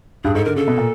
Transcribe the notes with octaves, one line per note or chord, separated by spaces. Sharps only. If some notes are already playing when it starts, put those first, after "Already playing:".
G2 G#4
G#2 A4
D3 A#4
C#3 A4
B2
A#2